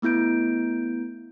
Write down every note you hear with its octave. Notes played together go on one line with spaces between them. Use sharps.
A3 B3 E4 G6 D7